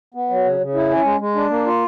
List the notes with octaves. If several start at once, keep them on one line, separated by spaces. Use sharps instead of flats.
B3
F#3
C#3
C#3
E4
C#4
G#3
G#3
D4
A#3
F4